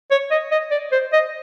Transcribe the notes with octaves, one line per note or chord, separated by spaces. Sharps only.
C#5
D#5
D#5
D5
C5
D#5